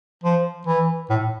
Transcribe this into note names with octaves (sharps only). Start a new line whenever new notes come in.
F3
E3
A2